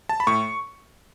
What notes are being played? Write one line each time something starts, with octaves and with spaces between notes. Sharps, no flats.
A5
B5
A2 C#6